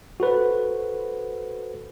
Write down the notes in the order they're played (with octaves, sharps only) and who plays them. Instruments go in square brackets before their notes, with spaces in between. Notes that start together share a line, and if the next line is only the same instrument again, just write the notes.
[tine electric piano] F#4 A4 B4 C5